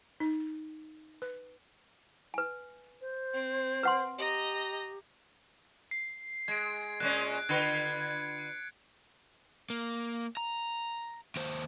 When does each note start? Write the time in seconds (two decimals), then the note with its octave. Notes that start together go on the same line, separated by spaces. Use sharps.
0.20 D#4
1.22 B4
2.34 B4 G#5
3.01 C5
3.34 C4
3.83 B4 F#5 C6
4.18 G4 D#5 A#5
5.91 C7
6.48 G#3 G#6 D7
7.00 A#2 G#3 C#4 F#6
7.49 D3 F4 B4 G#6 C#7
9.70 A#3
10.37 A#5
11.36 D#2 C5